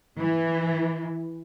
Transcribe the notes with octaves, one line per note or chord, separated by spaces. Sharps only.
E3